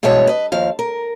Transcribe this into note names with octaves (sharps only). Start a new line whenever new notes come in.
G2 B2 E3 G#3 C#5 A5
B4 D#5
D#2 F3 F5
A#4